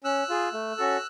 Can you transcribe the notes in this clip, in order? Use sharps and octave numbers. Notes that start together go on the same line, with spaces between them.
C#4 E6 F#6
F4 G#4
A3
C#4 F#4 A4